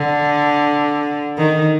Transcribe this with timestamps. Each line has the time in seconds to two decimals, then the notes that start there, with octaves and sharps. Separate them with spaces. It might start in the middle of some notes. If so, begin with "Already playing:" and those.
Already playing: D3
1.38 D#3